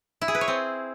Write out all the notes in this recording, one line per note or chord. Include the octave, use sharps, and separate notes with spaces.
E4
G#4
B4
C#5
C4